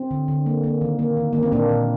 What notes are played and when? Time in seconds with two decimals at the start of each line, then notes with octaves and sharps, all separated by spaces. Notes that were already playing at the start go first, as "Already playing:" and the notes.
Already playing: C4
0.11 D3
0.28 D3
0.46 A#3
0.64 A#3
0.81 D#3
0.99 A#3
1.17 D#3
1.33 D#3 A#3
1.43 C4
1.52 A#2 A#3 D4
1.70 A#2